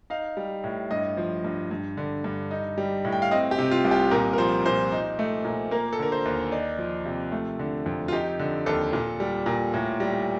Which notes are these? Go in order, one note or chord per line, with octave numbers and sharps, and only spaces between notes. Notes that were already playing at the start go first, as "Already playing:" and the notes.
D#4 F5
G3
A2
G2 D#5
F3
G2
G2
D3
G2
D#4
G3
A2
G5
F5
C4 D#5
G4
C3
F4
C2
G4
A#2 A#4
A#4
F3 C5
A#2 C5
D#4
A3
A#2
A#3 A#4
A4
D3 A#4
C5
D#2
D#4 D5
F3
C3
A3
D3
F2
F4
D#4 G4
D3
D#2 A4
A#2
G3
A#2
A2
G3